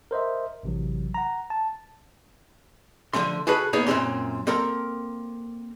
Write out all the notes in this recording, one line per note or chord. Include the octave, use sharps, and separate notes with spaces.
A#4 C5 D#5 E5
A1 C3 E3 F#3
F#5 A#5
A5
D3 F3 A3 C#4 C6
F#4 G#4 A4 B4
A#3 B3 D#4 G#4 C#5
F#2 A#2 C4 C#4 C6
A#3 C4 A4 A#4 A#5